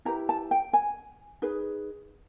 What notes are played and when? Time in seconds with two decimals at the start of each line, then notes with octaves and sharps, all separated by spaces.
0.05 E4 G4 B4 A#5
0.29 A5
0.51 G5
0.73 G#5
1.42 D#4 G#4 B4